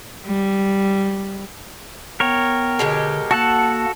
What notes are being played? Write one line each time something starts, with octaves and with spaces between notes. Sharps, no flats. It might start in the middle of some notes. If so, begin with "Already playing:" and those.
G3
B3 A#4 C#5 G5
B2 D3 G#3 G4
A#3 F#4 A4 F#5 A5